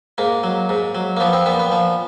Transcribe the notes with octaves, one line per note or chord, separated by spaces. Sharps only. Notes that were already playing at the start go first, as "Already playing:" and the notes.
G#2 A#3
F#3
G#2
F#3
A#3
F3 B3
C4
A#2 B3
B3
F3